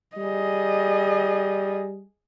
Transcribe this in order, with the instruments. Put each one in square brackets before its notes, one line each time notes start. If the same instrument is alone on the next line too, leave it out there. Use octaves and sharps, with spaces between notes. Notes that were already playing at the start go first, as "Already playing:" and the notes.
[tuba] G3 [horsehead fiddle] G#4 D#5